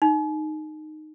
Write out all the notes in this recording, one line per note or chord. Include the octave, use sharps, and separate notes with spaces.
D#4